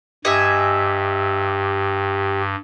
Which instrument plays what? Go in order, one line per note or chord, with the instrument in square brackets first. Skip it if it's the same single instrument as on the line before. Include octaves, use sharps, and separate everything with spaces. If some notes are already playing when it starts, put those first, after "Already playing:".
[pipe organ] G2 [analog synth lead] G4 [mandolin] D#5 E5 G#5